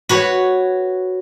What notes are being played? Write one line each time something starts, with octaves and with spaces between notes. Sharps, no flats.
F#4 B4 C#5